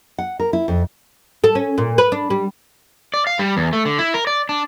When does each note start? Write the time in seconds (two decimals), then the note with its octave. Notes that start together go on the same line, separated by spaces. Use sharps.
0.18 F#5
0.40 A#4
0.53 E4
0.68 F2
1.44 A4
1.55 C#4
1.78 A#2
1.98 B4
2.12 D4
2.30 G3
3.14 D5
3.27 F5
3.39 G3
3.57 E2
3.73 A3
3.85 D3
3.99 E4
4.14 A#4
4.27 D5
4.49 D4